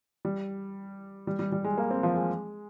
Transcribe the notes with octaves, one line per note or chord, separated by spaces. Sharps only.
G3
G3
G3
G3
G#3
A#3
C4
F3
G#3